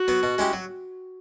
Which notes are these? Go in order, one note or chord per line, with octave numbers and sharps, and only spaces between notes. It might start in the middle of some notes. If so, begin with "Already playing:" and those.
Already playing: F#4
F#3 B3
B2
G#3 C#4 E4 G4
F#3